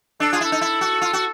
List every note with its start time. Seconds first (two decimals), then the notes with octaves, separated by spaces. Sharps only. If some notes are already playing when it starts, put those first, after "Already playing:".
0.20 D4 A4
0.33 F4 G#4
0.41 E4 A4
0.52 D#4
0.61 E4
0.81 F#4
1.02 F4
1.13 F#4